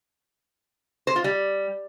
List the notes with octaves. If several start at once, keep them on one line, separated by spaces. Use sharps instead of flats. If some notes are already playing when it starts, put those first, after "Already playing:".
C5
F4
G3